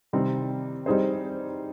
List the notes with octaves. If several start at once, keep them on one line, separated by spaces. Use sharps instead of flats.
C3 D#3 G3 C4
G3 C4 D#4 G#4 C5